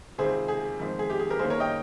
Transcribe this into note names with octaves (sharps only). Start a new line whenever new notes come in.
C#2 C3 D#3 G#4 C5
G#4
F2 D#3 G#3 C4
G#4
G4
G#4
G4 A#4
D#2 D#3 A#3 C#4 G#4 C5
A#4 C#5
D#5 G5